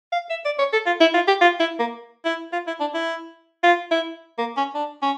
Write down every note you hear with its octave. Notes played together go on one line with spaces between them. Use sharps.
F5
E5
D5
C#5
A4
F4
E4
F4
G4
F4
E4
A#3
E4
F4
E4
D4
E4
F4
E4
A#3
C#4
D4
C#4